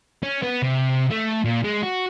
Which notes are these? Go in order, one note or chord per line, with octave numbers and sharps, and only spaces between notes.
C#4
B3
C3
A3
A#2
G#3
F#4